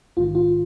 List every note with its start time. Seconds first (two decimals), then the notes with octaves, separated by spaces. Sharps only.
0.17 A#1 G#2 D#3 F4
0.35 F4